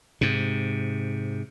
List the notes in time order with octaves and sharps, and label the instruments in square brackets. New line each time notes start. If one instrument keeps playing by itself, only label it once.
[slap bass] G#2 C3